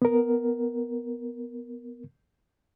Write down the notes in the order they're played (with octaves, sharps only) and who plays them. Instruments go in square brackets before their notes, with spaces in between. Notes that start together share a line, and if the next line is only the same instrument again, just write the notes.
[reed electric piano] B3 A#4